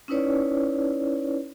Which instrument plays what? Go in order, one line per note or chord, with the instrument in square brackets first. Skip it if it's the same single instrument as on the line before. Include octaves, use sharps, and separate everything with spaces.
[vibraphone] C#4 D#4 E4 B4 C#5 D5